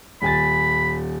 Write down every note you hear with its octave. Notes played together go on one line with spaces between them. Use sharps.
D#1 G#5 B5 A6